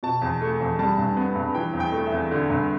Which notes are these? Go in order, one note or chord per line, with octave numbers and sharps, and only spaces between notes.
B2 A5
E2
A3
E2
G3 A5
G2
B3
G2
E3 G5
E2
G5
A3
E5
E2
D3
G2